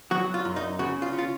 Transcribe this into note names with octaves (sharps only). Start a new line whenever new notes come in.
F#3 F#4
F4
F#2
D#4
C#3 F#4
F4
C#4
F4